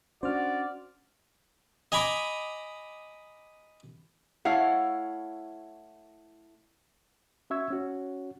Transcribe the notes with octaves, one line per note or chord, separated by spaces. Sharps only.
C#4 D4 F#4 C5 D5 F6
D#5 G#5 A#5 B5 D6
A3 E4 C#5 F5 F#5
C#4 F#4 E5 C#6 E6 G#6
C#4 F#4 C#5